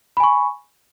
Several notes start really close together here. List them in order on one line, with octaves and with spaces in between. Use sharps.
B5 G#5 C#6